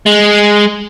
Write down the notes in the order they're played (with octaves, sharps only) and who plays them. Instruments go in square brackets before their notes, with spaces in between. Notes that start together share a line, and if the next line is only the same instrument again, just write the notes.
[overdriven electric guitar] G#3